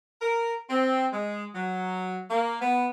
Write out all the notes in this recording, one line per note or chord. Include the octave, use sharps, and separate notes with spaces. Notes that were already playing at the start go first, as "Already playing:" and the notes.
A#4
C4
G#3
F#3
A#3
B3